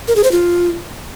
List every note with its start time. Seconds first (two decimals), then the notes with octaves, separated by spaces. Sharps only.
0.08 A#4
0.16 G#4
0.24 C5
0.32 F4